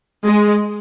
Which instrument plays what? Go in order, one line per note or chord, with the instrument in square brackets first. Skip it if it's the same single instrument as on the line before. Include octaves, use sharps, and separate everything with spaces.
[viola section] G#3